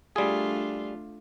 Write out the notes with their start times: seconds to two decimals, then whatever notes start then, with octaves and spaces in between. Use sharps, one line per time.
0.16 G3 A3 D4 F4 G#4